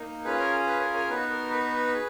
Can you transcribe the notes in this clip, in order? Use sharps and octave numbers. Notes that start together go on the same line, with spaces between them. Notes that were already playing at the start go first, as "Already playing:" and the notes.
Already playing: A#3 D#4
C#4 F4 G#4 B4
A#4 C#5
B4
A#4 C#5
A#4 C#5
B3 D#4 F#4 B4
A#4
B4
G#4